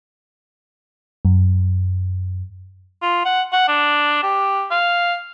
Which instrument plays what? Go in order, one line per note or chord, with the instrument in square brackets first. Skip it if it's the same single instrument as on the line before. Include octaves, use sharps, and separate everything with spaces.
[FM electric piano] F#2
[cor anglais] F4
F#5
F#5
D4
G4
F5